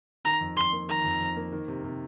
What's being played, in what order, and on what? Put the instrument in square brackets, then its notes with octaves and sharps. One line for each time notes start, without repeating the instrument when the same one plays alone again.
[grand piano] D#3 [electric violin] A#5
[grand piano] F2
[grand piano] F2 [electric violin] C6
[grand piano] A#3
[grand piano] D#3 [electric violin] A#5
[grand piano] F2
F2
A#3
D#3
C3
C3